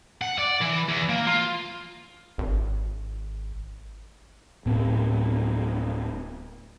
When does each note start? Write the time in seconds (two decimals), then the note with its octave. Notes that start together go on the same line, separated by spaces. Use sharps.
0.21 F#5
0.39 D5
0.62 E3
0.89 E2
1.09 A#3
1.27 F4
2.38 G#1
4.66 D1 A2 B3 C4